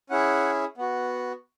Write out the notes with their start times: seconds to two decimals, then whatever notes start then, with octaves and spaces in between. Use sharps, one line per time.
0.10 C#4 E4 G#4 F#5
0.78 B3 F#4